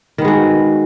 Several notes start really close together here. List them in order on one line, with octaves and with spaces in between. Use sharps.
D#3 B3 G#3 F#4